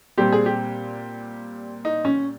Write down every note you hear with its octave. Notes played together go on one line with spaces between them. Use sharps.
A#2 G3 C4 G4
G#4
G4
D#4
C#4